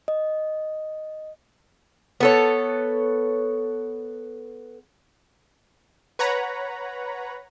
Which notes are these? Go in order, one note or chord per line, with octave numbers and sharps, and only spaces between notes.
D#5
B3 A4 C#5
B4 C#5 F#5 A#5 B5